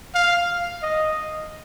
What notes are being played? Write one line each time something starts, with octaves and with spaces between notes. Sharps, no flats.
F5
D#5